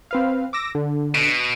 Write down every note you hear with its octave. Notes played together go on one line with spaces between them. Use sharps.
C4 B4 F5
D6 E6 A#6
D3
B2